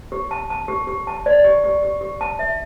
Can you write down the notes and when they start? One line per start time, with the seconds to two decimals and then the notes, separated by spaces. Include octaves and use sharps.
0.12 G4
0.31 A5
0.50 A5
0.68 G4
0.87 G4
1.07 A5
1.26 D5
1.44 G4
1.64 G4
1.83 G4
2.01 G4
2.21 A5
2.39 E5